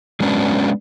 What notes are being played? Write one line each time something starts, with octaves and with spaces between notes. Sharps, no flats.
F#3 G#3 B3 C#4 D4